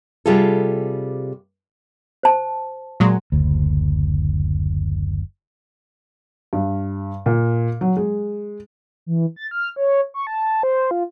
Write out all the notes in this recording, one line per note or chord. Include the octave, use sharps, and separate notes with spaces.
C3 G3 F4 G#4 A4
C5 A5
A#2 F#3 G#3
F#1 D2
G2
A#2
F#3
G#3
E3
A6
F6
C#5
C#6
A5
C5
F4